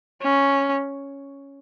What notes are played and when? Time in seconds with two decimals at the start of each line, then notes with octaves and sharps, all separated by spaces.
0.22 C#4